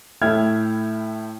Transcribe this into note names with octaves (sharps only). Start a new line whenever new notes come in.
A2 E4 G5 F6 G#6